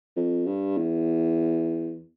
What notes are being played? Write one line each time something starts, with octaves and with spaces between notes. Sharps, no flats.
F2
G2
E2